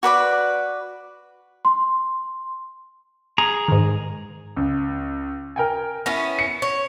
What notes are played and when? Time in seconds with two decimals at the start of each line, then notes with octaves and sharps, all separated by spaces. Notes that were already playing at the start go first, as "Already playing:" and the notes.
0.03 F#4 B4 D5 B5
1.65 C6
3.38 G#4 A#5
3.68 G#2 D#3
4.56 C#2
5.56 A#4 G5 G#5
6.06 B3 C#4 E4 A#6
6.39 C#7
6.62 C#5